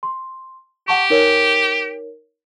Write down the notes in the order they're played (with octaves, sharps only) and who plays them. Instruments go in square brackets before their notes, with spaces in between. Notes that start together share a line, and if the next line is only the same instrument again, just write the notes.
[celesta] C6
[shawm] G4 [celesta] F#5 A5 C#6
[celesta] D#4 A#4 C#5